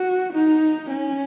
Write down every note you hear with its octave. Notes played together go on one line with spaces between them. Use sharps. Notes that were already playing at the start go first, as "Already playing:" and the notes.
Already playing: F#4
D#4
C#4